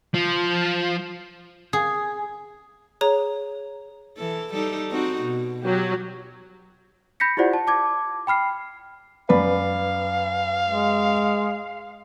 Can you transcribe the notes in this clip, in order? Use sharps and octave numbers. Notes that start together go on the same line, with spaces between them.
F3
G#4
G#4 C#5 A#5
E3 A4
G3 D#4 A4
C4 D#4 F#4
B2
F#3 F#4 G4
B5 G6 A#6 B6 C#7
E4 F4 G4 C5 D5 F#5
A5
A5 D6 G#6
G5 B5 F6 C7
F#2 B4 D5 F5 B5
G#3